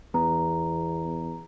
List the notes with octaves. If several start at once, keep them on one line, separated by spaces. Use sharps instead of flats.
E2 B3 A#5